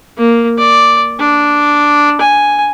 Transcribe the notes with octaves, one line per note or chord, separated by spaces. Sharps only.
A#3
D5
D4
G#5